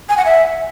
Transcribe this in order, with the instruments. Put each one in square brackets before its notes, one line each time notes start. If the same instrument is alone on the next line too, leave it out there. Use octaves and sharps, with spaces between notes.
[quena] G#5
F#5
E5